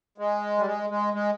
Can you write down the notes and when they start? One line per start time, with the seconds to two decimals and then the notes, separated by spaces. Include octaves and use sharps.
0.18 G#3
0.58 G3
0.66 G#3
0.90 G#3
1.14 G#3